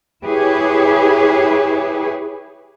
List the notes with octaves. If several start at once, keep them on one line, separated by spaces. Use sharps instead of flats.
E4 G4 G#4 B4 C#5